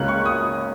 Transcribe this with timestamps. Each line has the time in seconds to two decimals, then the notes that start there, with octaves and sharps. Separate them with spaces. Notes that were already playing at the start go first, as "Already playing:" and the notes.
Already playing: C#2 C#3 A#3 C#4 F#6
0.08 C#6
0.26 D#6